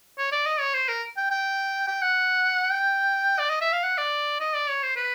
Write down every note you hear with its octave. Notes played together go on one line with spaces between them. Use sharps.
C#5
D5
D#5
C#5
C5
A#4
G5
G5
G5
F#5
G5
D5
D#5
E5
F5
F#5
D5
D#5
D5
C#5
C5
B4